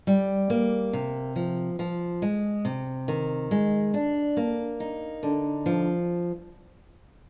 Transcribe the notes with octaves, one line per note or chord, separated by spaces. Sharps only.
G3
A#3
C3
F3
F3
G#3
C3
D#3
G#3
D4
A#3
D#4
D3
F3